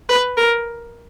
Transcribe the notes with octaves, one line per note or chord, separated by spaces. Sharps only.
B4
A#4